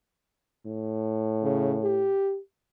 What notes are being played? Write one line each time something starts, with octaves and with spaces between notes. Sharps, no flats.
A2
C#3
G4